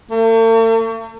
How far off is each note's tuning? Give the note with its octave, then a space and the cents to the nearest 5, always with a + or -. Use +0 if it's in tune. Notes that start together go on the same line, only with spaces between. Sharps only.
A3 +45